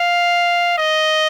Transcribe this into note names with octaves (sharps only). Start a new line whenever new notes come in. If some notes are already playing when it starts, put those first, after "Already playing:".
Already playing: F5
D#5